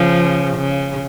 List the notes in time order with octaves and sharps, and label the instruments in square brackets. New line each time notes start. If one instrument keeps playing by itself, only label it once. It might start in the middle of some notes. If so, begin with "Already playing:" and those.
Already playing: [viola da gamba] C#3 F3
C#3